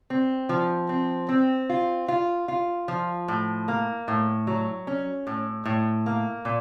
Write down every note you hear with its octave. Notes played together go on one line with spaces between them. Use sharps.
C4
F3
C4
C4
F4
F4
F4
F3
A2
A#3
A2
F#3
C#4
A2
A2
A#3
A#2